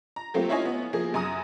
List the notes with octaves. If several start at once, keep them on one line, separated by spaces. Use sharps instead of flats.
A#5
F#3 A3 A#3 C4 F4 G4
C#4 E4 F4 C#5 D#5 G#5
B3
F3 A#3 G#4
F#2 G#5 A#5 D#6 D#7